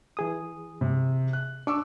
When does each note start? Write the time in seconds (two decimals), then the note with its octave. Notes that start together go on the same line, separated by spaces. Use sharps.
0.17 E3 G#4 D#6
0.81 C3
1.33 F#6
1.67 D4 C#6 D6 E6